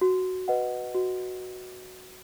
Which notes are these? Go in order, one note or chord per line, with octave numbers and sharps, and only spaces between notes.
F#4
B4 D#5 F#5
F#4